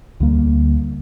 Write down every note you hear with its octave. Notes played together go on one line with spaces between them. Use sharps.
D2 D3 G3 A#3